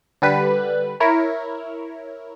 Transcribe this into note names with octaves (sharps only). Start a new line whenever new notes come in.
D3 G3 B4
E4 A#4 C#5